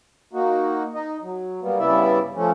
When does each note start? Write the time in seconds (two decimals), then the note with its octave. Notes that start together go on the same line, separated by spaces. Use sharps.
0.33 A#3 D#4 F#4
0.95 D#4 D#5
1.22 F#3
1.62 G3 A#3 B3
1.79 G2 C#3 B3 E4 D5 E5
2.35 F3 A3 C#4